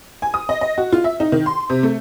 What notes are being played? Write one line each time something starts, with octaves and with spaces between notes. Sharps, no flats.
G#5
D#6
D#5
D#5
F#4
F4
E5
D#4
D#3
C6
C3
A3